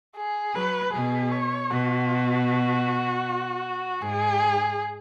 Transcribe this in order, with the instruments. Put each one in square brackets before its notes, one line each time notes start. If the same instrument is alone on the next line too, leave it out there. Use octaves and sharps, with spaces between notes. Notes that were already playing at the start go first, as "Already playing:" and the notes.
[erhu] G#4
[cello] F#3 [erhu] B4
[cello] B2 [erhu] G#4
[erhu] C#5
[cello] B2 [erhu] F#4
[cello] G#2 [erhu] G#4